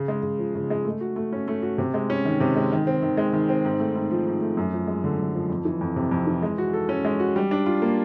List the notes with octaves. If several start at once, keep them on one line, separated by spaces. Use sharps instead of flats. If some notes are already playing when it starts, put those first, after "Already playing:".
Already playing: C#3
G#3
C#3
F3
C#3
G#3
A3
F#4
A3
C#4
A3
F#4
C3
G#3
C#4
D#3
C3
G#3
D#3
C4
D#3
G#3
D#3
C4
G#2
A3
G#2
F3
G#2
A3
F#2
F3
G#3
D3
F#2
F3
F2
E3
F2
C3
F2
E3
G#3
F#4
A4
C#4
G#3
F#4
G3
D4
F4
A#3